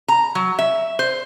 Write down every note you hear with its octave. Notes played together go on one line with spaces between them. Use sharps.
A#5
F#3
E5
C5